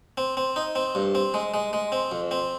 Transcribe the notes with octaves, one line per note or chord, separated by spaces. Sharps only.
C4
C4
D#4
C4
G2
C4
G#3
G#3
G#3
C4
F2
C4